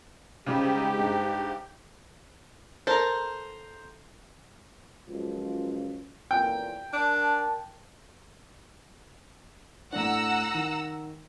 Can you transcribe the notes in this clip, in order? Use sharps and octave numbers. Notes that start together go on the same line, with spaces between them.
G#2 C#3 G3 G4
G2
A4 A#4 C5 A#5
C#2 F#2 F3
A1 A#2 G5
D4 A#4 A5
A2 D4 F#5 A#5 E6
D#3